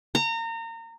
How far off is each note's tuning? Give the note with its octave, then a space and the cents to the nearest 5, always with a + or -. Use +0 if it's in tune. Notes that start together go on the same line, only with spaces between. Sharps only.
A#5 -30